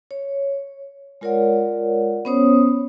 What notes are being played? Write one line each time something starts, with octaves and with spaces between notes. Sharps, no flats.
C#5
G#3 F4 A#4 C#5 D5 F#5
B3 C#4 C5 C#5 D#6